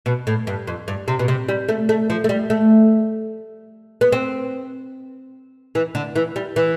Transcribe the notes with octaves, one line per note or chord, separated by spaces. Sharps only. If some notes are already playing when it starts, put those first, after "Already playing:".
B2
A2
G2
F2
G2
C3
B2
C3
G3
A3
A3
F3
A3
G3
A3
B3
C4
E3
D3
E3
G3
E3